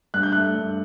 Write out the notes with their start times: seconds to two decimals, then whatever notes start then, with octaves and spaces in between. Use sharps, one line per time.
0.14 G2 F#6
0.23 G6
0.32 A3 F#6
0.55 G2